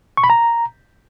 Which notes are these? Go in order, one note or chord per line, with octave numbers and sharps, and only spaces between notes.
C#6
B5
A#5